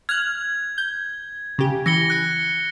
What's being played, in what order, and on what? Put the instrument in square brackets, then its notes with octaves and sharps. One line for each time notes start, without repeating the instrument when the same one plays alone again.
[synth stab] F6 F#6 [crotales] G#6
[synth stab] G6
C#3 G4
[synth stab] E3 [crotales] A#6 C#7 G7
[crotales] F#6 C#7